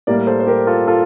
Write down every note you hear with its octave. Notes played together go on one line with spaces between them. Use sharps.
A2 G3 A#3 A#4 D5
A4 C5
C5
G4 A#4
F4 A4
F4 A4